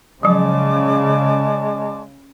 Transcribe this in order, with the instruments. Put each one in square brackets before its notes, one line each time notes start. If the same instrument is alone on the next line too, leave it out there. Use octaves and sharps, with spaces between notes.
[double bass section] C#3 [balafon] F3 F#3 [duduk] G#3 [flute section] D5 A5 D6